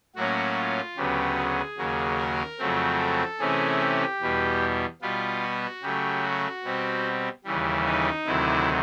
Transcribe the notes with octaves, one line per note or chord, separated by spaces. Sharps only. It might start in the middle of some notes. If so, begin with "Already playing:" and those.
A2 F#3 A#3 C#4 F#4
F4
D2 C#3 F#3 B3 G4
G#4
D#2 C#3 F#3 A#3
A#4
F2 C#3 F#3 A3 C4
A4
C3 E3 A3 C#4 G#4
G4
E2 B2 G3
B2 G3 B3 F4
F#4
C#3 F#3 A3 G4
F#4
B2 G3 C4
D#2 C#3 E3 G3
D#4
D2 C3 D#3 F#3 E4